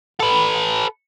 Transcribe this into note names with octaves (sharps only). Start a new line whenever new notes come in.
A4 B4